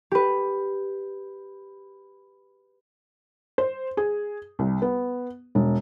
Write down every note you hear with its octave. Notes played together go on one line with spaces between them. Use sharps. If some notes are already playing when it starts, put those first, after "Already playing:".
G4 B4
C5
G#4
C2
B3
E1